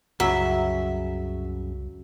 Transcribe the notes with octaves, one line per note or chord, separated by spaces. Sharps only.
C2 F#2 C#3 F#3 E5